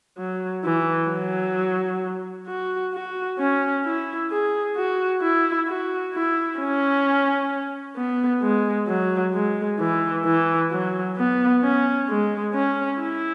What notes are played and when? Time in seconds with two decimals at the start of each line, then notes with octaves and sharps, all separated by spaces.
0.18 F#3
0.64 E3
1.10 F#3
2.47 F#4
2.93 F#4
3.39 C#4
3.85 E4
4.30 G#4
4.76 F#4
5.21 E4
5.68 F#4
6.13 E4
6.59 C#4
7.96 B3
8.42 G#3
8.87 F#3
9.34 G#3
9.79 E3
10.25 E3
10.71 F#3
11.17 B3
11.63 C#4
12.09 G#3
12.54 C#4
13.00 E4